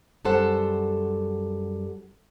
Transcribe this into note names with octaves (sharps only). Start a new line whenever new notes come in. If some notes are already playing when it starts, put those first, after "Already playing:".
F#2 G3 A4 C5 F#5